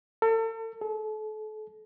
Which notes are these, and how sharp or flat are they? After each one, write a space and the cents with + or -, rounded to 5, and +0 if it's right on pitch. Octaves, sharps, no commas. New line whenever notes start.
A4 +40
A4 -35